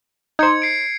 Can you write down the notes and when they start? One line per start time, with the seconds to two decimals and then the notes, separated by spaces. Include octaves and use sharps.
0.39 D#4 C5 G#6 C#7
0.62 C7 D7